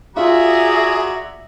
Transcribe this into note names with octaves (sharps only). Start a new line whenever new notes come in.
F4 F#4 G#4 D5 E5 A#5